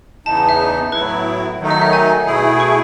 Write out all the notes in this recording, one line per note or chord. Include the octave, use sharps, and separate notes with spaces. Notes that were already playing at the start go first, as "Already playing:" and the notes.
E2 C#3 E3 B3 D#4 A5
A5
E5
A2 F#3 B3 E4 B4
D#3 F#3 A3 D#4
D#5
E5
G#5
B2 A3 E4 G#4
C#6